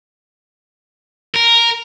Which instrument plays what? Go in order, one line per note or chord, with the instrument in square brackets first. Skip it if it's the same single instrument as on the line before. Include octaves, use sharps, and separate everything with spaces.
[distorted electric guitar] A#4